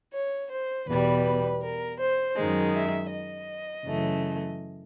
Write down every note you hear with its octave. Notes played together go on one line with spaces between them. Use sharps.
C#5
C5
E2 B2 G3 B4
A#4
C5
F#2 D#3 G#3
E5
D#5
F#2 C#3 E3 A3